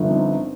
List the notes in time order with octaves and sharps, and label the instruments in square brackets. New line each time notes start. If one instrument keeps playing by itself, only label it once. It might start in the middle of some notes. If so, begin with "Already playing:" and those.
Already playing: [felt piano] G1 G2 F3
C4 D#4